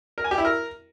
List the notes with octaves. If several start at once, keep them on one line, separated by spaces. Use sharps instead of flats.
A#4
G#5
G4
E4
A#4